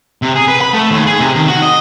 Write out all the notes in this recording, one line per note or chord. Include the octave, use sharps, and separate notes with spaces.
C3
G#4
B4
B5
A3
D#2
G#4
C3
D#3
F#4
D#5